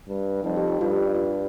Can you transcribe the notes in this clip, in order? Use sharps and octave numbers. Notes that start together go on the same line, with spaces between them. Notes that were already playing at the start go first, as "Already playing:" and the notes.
G2
F2 D#4
G4
F4
G2 F4
G4
F4